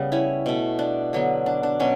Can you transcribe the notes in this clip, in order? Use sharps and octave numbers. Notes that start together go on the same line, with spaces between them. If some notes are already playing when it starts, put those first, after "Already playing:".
Already playing: C#3 G3 B3
C#4 E4
B2 A3
D4
D3 F#3 B3
D4
D4
B2 F#3 C#4